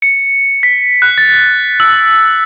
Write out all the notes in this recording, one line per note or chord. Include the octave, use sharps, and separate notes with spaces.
C#7
B6
F#6
A6
E6